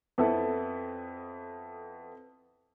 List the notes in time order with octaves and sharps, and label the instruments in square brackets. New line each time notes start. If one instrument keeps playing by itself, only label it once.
[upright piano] F2 B3 E4 A4